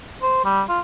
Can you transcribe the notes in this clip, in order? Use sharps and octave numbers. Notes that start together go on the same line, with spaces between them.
C5
G3
F4